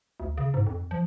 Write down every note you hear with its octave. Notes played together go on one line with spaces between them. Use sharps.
D2
C#3
G#2
F2
F3